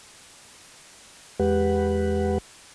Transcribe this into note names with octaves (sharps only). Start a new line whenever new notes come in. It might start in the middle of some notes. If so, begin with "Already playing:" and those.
E2 G#3 G4 B4 F#5